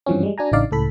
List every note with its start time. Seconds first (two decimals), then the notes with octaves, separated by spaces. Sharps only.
0.06 G2 E3 F3 C4 C#4
0.23 G3 G#3
0.38 D4 F#4 G#5 A#5
0.52 A1 C#3 D4 D#4 D5 F5
0.71 C#2 A2 A4 B5